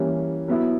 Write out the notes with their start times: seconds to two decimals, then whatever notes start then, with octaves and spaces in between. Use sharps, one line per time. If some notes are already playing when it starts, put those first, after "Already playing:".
Already playing: E3 G3 A#3 C#4
0.48 F#3 B3 E4